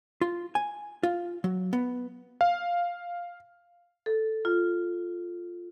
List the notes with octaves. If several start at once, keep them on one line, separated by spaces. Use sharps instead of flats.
F4
G#5
F4
F#3
B3
F5
A4
F4